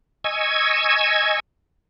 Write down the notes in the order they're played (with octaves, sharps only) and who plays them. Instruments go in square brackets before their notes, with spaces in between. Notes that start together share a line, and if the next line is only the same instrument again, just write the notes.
[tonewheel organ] D#5 G#5 C#6 E6 G#6